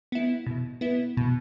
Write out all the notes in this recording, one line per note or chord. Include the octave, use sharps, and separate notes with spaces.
B3 E4
B2
B3 E4
B2